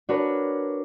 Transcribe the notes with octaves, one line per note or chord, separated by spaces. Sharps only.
D4 F#4 A#4 B4 C#5